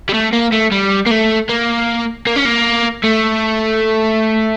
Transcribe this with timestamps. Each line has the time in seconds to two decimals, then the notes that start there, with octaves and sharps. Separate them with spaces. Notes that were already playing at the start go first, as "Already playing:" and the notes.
0.09 G3
0.14 A3
0.33 A#3
0.52 A3
0.72 G3
1.06 A#3
1.11 A3
1.49 A#3
2.27 A#3
2.36 C#4
2.45 A#3
3.04 A3